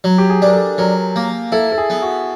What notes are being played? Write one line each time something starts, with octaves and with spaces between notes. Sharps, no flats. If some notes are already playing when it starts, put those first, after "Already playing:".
F#3
G4
G#4
D4 A#4
A4
F#3 A#4
A#3
E4 A4
A4
G#4
B3
F#4